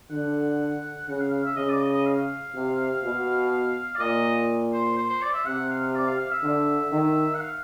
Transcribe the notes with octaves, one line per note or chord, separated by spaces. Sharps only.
D3 F#5
C#3 F#5
F5
F5
E5
C#3 D#5
D5
D#5
D#5
F5
C3
B2
D5
A#2 D#5
C5
C5
C5
D5
E5
C3 F#5
F5
D5
F5
F5
E5
D3
D#3
F#5
F5